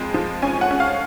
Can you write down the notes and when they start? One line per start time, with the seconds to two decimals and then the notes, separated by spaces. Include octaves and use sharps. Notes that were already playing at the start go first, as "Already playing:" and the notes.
Already playing: F2 G#3
0.14 F3
0.42 C#4 G#5
0.61 F#5
0.71 C#4
0.80 F5